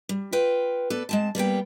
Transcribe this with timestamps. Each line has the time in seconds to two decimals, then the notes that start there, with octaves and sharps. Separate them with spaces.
0.09 G3
0.33 F4 B4 G5
0.90 B3 A4 B4 D5
1.09 G#3 C4 A5
1.35 G3 A#3 B3 G5